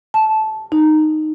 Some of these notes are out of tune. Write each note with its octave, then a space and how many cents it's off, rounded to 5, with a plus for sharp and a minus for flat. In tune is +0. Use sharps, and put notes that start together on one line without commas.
A5 -15
D#4 -10